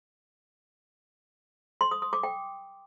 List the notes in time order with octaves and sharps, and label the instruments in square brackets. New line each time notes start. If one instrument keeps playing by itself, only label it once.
[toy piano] C6
D#6
D#6
D6
G5